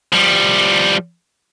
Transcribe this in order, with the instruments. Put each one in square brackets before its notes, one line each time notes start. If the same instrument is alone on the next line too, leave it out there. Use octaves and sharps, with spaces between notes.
[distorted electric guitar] F3 G3